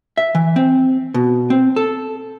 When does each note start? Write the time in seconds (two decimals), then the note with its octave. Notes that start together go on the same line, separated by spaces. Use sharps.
0.17 E5
0.35 E3
0.56 C4
1.14 B2
1.50 C4
1.76 A4